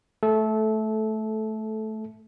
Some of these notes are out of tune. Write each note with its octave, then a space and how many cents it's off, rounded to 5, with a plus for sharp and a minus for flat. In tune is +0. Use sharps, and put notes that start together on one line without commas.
A3 -10 A4 -20